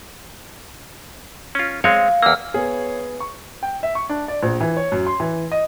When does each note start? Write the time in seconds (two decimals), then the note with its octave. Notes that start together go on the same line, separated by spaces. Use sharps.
1.55 C#4 F4
1.84 G#3 C4 C#5 F5
2.23 E2 A#3 E6 F6
2.54 B3 G#4 C#5 F5
3.20 C#6
3.63 G5
3.83 E5
3.95 C#6
4.09 D4
4.28 D5
4.43 A#1
4.61 E3
4.77 C#5
4.92 F#2
5.07 C6
5.20 E3
5.52 D#5